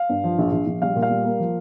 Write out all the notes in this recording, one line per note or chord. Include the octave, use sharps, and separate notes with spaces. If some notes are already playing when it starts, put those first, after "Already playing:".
Already playing: F5
G2
F3
A#1
A#1
A#1
G3 F5
A#2
F5
G3
A#3
F3